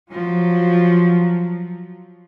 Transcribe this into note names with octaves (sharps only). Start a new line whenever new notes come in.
F3 F#3